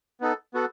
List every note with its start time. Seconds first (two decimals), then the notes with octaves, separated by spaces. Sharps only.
0.20 B3 D#4 A4
0.54 B3 F#4 A4